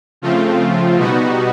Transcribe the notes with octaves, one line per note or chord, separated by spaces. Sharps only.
C#3 F3 A3 C4 F4
B2 G3 B3 D#4 F#4